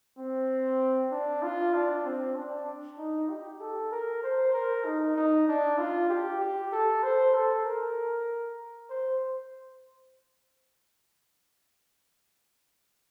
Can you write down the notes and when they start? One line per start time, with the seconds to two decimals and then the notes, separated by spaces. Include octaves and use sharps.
0.18 C4
1.11 D4
1.43 F4
1.74 D4
2.05 C4
2.36 D4
2.98 D#4
3.29 G4
3.61 A4
3.92 A#4
4.23 C5
4.54 A#4
4.85 D#4
5.16 D#4
5.48 D4
5.78 F4
6.10 G4
6.41 G4
6.72 A4
7.03 C5
7.34 A4
7.65 A#4
8.90 C5